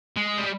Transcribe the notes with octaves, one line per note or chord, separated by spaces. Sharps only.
G#3
G3